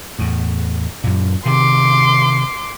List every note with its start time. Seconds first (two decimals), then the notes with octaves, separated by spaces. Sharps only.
0.19 E2 A2
1.04 F#2 A#2
1.46 C3 D#3 C6 D6